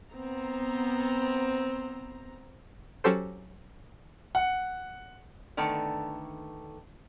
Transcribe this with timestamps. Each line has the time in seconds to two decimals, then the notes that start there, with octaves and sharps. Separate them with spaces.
0.11 B3 C4 A#5
3.04 F#3 C#4 F#4 G4 A4 C5
4.35 F#5
5.57 D3 D#3 A3 B3